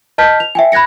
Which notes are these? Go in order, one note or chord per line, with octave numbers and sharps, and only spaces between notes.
D#5 A5 F6 G6 B6
F7
E5 G5 G#5
B5 F#6 G#6 A#6 C#7